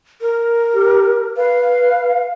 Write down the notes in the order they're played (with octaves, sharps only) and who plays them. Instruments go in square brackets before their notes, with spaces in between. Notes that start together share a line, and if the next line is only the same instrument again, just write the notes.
[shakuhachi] A#4
[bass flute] G4
[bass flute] B4 [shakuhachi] F5